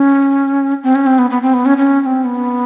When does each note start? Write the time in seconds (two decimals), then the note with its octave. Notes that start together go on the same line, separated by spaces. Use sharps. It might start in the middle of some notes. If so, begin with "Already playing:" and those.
Already playing: C#4
0.83 C4
0.95 C#4
1.07 C4
1.19 B3
1.31 B3
1.42 C4
1.54 B3
1.66 C#4
1.77 C#4
2.01 C#4
2.06 C4
2.25 B3